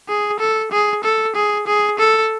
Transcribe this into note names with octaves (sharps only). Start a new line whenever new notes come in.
G#4
A4
G#4
A4
G#4
G#4
A4